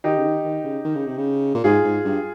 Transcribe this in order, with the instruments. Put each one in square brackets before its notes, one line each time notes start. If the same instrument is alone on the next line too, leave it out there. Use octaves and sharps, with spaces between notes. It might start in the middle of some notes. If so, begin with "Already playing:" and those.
[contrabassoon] D#3 [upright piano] D#4 G4
[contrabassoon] C#3
D#3
D#3
C#3
D#3
C#3
C3
C#3
A#2
[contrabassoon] G#2 [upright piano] F4 G#4
[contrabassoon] G#2
G2